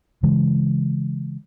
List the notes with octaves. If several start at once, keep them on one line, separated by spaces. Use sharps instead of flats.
C#3 E3 G#3